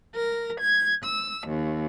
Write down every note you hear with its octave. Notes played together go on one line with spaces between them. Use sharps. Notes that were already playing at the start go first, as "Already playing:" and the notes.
A#4
G#6
E6
D#2